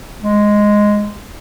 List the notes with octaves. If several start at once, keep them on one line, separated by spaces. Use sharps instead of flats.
G#3